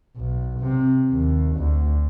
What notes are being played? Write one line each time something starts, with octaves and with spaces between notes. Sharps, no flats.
B1
C3
D#2
D2